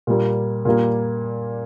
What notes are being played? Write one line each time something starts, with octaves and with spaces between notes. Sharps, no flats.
A#2 G3 A#3
A#2 G3 A#3